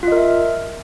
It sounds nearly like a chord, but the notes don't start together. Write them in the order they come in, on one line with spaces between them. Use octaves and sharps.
F4 D#5 A#4 E5